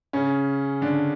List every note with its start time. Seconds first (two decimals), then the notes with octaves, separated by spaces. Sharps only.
0.13 C#3 C#4
0.82 D3 D4